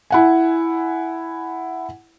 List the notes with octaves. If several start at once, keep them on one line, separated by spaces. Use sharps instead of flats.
E4 F#5 G#5